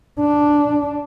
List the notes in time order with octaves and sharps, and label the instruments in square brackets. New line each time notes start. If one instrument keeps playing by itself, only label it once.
[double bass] D4